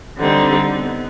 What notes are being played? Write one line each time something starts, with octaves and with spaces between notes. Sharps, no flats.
D3 G3 C4 D#4
B3